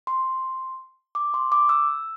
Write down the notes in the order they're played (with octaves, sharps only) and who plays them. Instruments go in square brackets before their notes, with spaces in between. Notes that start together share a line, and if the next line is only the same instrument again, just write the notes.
[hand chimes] C6
D6
C6
D6
E6